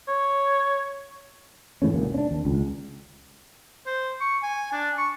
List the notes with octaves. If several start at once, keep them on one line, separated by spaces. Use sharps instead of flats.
C#5
G#2 E3 A3 C#4
E1 D2 A#3
C#4 D4
D#2
C#2
C5
C#6
G#5
D4
C#6